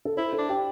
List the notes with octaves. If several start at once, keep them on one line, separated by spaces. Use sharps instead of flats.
A4
E4 C5
A4
D4
G4